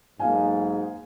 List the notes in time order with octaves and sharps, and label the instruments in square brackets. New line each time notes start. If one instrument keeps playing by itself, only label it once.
[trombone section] B1 G#2 [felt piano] A#3 F5 G#5